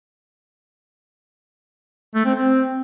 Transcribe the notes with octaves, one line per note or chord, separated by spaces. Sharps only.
A3
C4
C4